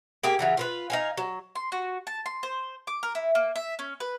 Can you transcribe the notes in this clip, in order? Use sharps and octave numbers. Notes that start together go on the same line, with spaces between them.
A#3 G4 G#4
C#3 E3 F#3
F4 A#4 B4
D#4 F5 G#5
F#3
C6
F#4
A5
C6
C5
D6
A#4
E4
A#3
E5
C#4
B4